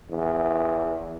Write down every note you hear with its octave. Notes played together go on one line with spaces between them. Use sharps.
E2